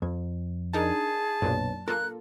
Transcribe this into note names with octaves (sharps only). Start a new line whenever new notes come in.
F2
D4 D#4 G#4 A#4 A5
B1 F#2 A#2 D4
A#3 F4 A4 A#4 F#6